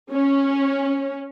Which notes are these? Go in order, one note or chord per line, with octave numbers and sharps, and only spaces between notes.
C#4